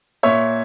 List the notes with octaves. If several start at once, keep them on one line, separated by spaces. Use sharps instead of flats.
A#2 C#5 E5